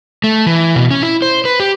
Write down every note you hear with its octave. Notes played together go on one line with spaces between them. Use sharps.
A3
E3
B2
C#4
E4
C5
B4
G4